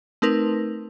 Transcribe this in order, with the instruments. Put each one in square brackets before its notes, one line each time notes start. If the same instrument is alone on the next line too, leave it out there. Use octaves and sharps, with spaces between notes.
[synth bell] A3 C4 D#4 A#4 B4